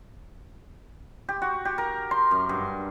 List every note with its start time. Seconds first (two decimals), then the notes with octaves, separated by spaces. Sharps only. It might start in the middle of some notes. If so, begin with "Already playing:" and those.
1.29 G4
1.42 F#4
1.65 G4
1.78 A#4
2.11 C6
2.31 F#2
2.49 G2